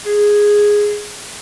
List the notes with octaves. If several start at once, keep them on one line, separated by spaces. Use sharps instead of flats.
G#4